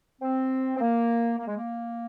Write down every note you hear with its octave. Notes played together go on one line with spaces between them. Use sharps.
C4
C4
A#3
A#3
G#3
A#3